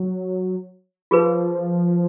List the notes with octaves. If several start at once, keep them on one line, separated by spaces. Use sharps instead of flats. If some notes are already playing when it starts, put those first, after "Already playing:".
Already playing: F#3
F3 F4 G#4 B4